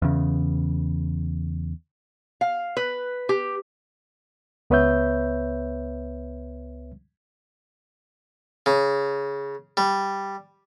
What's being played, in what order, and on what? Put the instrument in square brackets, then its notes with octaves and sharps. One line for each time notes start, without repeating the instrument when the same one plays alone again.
[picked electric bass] E2 C#3
[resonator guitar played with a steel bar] F5
B4
G4
[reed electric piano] C#2 B3 B4 C#5 E5 G6
[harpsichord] C#3
G3